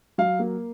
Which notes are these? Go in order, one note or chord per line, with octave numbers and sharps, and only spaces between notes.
F#3 F5
A#3